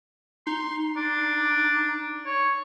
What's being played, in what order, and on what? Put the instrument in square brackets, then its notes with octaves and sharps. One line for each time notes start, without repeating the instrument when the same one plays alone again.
[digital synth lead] D#4 [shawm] C6
[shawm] D4 [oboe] D6
[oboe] C#5